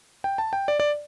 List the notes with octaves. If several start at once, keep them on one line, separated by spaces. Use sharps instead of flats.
G5
A5
G5
D5
D5